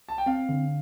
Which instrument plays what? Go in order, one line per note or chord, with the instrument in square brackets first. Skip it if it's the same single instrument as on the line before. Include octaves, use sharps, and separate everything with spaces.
[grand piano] A5
G5
[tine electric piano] C4 [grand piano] F5
[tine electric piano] D3